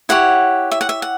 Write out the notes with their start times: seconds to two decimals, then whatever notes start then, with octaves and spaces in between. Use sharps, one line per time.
0.09 E4 G4 C#5 F#5
0.71 E5
0.81 F#5
0.89 E5
1.02 F#5